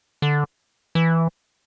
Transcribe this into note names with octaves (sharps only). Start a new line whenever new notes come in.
D3
E3